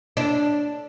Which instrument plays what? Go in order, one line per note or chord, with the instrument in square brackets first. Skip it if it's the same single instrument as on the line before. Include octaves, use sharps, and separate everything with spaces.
[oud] D4